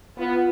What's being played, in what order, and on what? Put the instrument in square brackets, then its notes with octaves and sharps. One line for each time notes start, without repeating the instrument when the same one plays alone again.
[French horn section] B3 [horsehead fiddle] F4